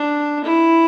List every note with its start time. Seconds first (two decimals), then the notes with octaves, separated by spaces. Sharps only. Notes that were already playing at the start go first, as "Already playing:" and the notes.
Already playing: D4
0.44 E4